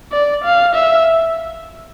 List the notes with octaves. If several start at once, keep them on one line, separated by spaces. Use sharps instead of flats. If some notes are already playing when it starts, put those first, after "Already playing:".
D5
F5
E5